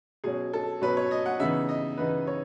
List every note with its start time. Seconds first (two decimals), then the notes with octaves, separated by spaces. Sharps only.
0.24 B2 F#3 C#4 G#4
0.53 A4
0.82 B2 F#3 C#4 B4
0.97 C#5
1.11 D#5
1.26 F#5
1.40 C#3 E3 B3 D#4 E5
1.69 D#5
1.97 C#3 E3 B3 D#4 B4
2.27 C#5